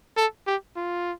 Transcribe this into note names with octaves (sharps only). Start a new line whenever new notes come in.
A4
G4
F4